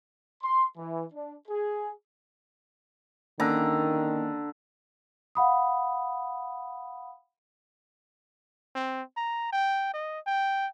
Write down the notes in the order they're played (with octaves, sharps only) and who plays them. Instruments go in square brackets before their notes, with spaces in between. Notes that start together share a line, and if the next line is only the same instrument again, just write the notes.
[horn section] C6
E3
D4
G#4
[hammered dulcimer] D3 A#5 [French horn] D#3 [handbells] A#3 C#4
[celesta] F5 F#5 B5 D#6
[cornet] C4
A#5
G5
D#5
G5